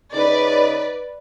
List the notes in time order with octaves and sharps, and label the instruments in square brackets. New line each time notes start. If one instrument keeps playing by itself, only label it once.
[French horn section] C#3 D#4 [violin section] B4 D5